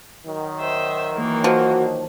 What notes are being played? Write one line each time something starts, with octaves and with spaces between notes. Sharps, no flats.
D#3 F#3
C5 E5
E3 A#3
F3 F#4